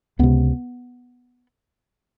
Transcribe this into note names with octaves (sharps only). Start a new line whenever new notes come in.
C#2 C3 B3